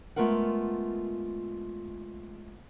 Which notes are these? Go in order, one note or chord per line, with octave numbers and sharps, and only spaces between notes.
G#3 A3 B3 F4 A#4 F#5